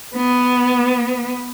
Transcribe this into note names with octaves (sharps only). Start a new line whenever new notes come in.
B3